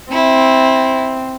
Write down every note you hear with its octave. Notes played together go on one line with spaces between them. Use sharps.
C4 E4